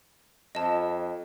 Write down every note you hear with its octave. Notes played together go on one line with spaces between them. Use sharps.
F2 D#5 A5